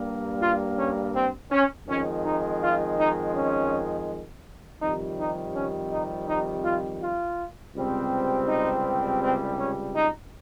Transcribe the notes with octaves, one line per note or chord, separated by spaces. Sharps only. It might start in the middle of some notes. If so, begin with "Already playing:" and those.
Already playing: G2 G3 A#3
F4
C#4
C4
C#4
F2 D#3 G#3 C#4
D#4
F4
D#4
C#4
F2 C3 D#3 G3 D#4
D#4
C#4
D#4
D#4
F4
F4
C#2 C3 G3 C4
D#4
C4
C#4
D#4